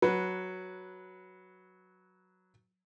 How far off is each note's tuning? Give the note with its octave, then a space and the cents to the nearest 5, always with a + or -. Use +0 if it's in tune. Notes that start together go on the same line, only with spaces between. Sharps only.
F#3 +0 B4 -10